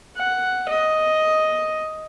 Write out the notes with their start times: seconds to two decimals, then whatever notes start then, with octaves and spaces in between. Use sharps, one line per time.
0.18 F#5
0.70 D#5